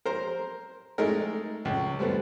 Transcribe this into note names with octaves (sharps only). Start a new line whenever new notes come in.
A#4 C5 A#5
G#3 A3 D#4 A#4
C#2
F3 G3 A3 B3